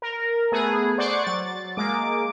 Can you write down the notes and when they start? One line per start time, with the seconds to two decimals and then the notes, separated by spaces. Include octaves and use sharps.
0.02 A#4
0.52 A3 B3 G#4
0.98 C5 D5 F#5 C#6 D6
1.24 F#3 A6
1.77 G#3 A#3 D6